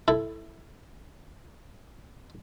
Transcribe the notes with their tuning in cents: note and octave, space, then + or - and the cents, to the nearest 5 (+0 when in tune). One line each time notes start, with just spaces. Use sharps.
E4 +0 A4 +0